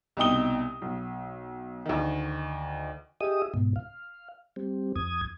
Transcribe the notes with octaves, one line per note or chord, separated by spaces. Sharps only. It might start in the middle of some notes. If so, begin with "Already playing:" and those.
C2 B2 D#4 G5 D#6 G7
B1
D2 D#3
G4 G#4 D#5 E5 D#6
G#2 B2
F5
G3 C4
F2 D#6 G#6